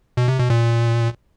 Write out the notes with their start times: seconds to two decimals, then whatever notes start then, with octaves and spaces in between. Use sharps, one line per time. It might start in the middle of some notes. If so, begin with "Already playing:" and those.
0.17 B2
0.28 C3
0.39 B2
0.50 A#2